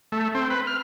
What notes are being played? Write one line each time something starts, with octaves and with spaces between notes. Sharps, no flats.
A3
C4
B4
F6